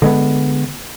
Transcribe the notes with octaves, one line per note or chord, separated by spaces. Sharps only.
D3 G#3 B3